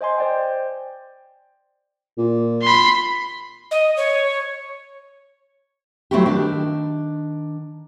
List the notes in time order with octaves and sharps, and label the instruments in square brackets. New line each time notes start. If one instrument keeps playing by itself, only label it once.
[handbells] C5 D#5 G#5 C6
C5 D5 G5
[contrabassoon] A#2
[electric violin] B5 C6
[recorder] D#5
C#5
[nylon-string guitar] F#3 A3 C4 E4 F#4 G4
D#3 D4